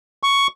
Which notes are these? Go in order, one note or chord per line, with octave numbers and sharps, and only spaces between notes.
C#6